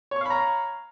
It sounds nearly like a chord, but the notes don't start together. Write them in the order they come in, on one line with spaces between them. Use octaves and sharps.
C#5 C#6 F5 B5 A#5